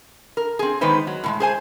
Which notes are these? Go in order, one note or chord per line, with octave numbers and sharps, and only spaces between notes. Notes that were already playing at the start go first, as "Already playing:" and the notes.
A#4
C4 G#4
D#3 G#3 B3 D#4 B4 C5
F#3
A2 E3 G#3
G#4 C5 G#5